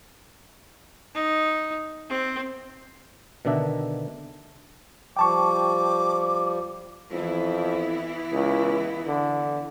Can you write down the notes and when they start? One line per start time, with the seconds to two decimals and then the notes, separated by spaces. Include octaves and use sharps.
1.15 D#4
2.10 C4
3.45 B2 D3 D#3 D4 E5
5.17 F3 G3 G5 A5 C#6 D6
7.12 F2 E3 B3 E4
8.33 C#2
9.07 D3